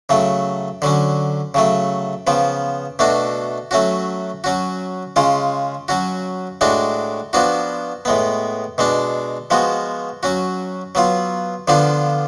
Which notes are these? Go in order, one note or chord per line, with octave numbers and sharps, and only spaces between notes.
C#3 F#3 A3
D3 F#3 C#4
C#3 F#3 A3
C#3 F3 B3
B2 A3 D4 F#4
F#3 A3 C#4 F#4
F#3 C#4 F#4
C#3 G#3 C#4 F4
F#3 C#4 F#4
A2 G#3 D4 F#4
F3 B3 D4 F#4
A2 G#3 B3
B2 G#3 D4
F3 G#3 B3 F#4
F#3 C#4 F#4
F#3 B3 F4
D3 F3 B3 D4 F4